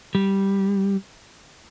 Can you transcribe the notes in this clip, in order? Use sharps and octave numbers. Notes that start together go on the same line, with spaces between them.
G3